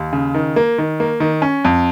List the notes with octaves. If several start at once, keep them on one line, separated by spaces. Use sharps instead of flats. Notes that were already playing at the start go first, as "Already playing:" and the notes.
Already playing: D#2
C#3
D#3
A#3
D#3
A#3
D#3
C#4
F2